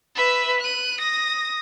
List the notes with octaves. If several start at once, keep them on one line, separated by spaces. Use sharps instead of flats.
B4 E5
F#6 D#7
D#6 A#6